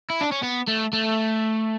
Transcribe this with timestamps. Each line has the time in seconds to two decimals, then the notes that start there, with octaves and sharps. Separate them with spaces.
0.10 E4
0.21 D4
0.32 C#4
0.43 B3
0.68 A3
0.93 A3